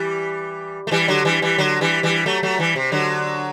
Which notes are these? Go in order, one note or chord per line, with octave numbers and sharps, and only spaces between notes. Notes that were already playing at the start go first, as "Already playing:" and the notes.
Already playing: E3 G3
A3
E3 G3
D3 F#3
E3 G3
E3 G3
D3 F#3
E3 G3
E3 G3
F#3 A3
F#3 A3
E3 G3
C3
D3 F#3